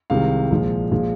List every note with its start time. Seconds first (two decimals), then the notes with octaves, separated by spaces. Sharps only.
0.10 C2 C3 D#3 G#3 F5
0.51 A#1 A#2 F3 G#3
0.92 A#2 F3 G#3